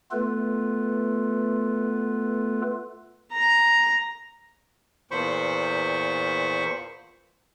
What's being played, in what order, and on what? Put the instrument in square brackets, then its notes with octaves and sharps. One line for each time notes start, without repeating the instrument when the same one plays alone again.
[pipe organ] A3 B3 F4 A4 B4
[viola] A#5
[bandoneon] E2 A#2 C5 B5 C#6